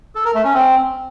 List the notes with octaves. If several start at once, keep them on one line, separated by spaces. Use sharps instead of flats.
A4
A#4
A3
C#4
C4